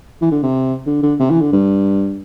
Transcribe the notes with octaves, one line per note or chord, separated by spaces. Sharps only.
E3
D3
C3
D3
D3
C3
E3
D3
G2